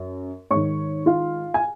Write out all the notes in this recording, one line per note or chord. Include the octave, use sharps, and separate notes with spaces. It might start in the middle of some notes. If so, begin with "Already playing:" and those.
Already playing: F#2
G#2 D#3 C#5 C#6
F4 F5
G#5